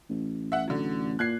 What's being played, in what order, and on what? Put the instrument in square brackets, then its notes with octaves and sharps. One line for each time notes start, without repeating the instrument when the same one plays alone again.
[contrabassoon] A1
[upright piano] E5 F#5
D3 F#3
[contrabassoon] A#2 [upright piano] F#6 G#6 C7